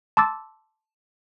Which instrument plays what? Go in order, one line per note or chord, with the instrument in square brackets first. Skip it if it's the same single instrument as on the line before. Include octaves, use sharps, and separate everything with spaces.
[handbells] A5 C6 D6 E6 A6